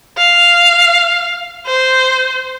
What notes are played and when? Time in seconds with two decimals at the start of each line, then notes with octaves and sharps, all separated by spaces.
0.18 F5
1.67 C5